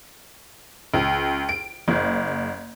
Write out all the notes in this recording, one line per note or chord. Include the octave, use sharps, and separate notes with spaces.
C#2
D7
F#1